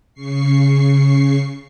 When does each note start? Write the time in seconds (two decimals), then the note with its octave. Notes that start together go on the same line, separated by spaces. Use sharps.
0.14 C#3 C#6 C7